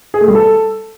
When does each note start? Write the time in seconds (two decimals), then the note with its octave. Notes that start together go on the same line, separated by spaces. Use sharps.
0.14 G#4
0.21 A3
0.28 G3
0.35 A4